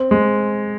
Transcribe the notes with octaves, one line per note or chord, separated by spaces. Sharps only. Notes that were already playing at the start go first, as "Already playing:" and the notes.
Already playing: C4
G#3